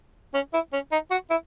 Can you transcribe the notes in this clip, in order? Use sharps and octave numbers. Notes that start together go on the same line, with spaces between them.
C#4
E4
C#4
D#4
F#4
E4